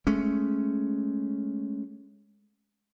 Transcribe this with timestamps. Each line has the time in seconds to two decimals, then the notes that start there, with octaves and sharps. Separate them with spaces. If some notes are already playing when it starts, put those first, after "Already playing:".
0.07 G#3 A3 C#4